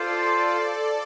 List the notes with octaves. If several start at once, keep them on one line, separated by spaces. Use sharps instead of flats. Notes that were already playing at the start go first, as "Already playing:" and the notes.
Already playing: F4 A4 C5 D5 F5